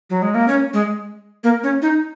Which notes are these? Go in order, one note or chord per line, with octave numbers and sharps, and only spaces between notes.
F#3
G#3
A#3
C#4
G#3
A#3
C#4
D#4